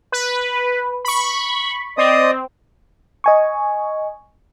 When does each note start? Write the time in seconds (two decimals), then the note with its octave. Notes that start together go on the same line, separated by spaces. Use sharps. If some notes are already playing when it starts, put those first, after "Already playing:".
0.12 B4
1.05 B5 C#6
1.98 C4 D5 D#5 D#6
3.24 D#5 G#5 C#6